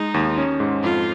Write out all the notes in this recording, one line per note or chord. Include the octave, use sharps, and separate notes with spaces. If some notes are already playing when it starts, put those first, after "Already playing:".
Already playing: G#3 D#4
D#2
C#4
G#2
F2 F4